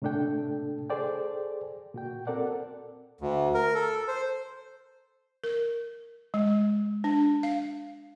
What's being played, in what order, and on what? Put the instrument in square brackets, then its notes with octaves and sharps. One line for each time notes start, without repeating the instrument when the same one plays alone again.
[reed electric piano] A2 C3 A3 D4 A4 G5
G#4 A4 C5 D5 G5
A#2 F#4 G5
C4 A4 A#4 D5 F#5
[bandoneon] D2
A#4
A4
C5
[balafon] A#4
G#3
D4
F5